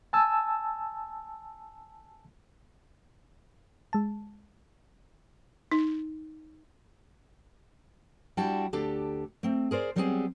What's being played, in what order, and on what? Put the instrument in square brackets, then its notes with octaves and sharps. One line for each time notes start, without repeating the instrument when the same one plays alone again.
[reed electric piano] G#5 A5 E6
[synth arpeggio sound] G#3 A5
[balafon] D#4
[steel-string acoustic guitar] G3 D4 E4 F#4 G5 A5
D2 D4 G4 A4
A3 C4
G#4 A#4 C5 D5
F#3 G3 B3 C4 G4 G#4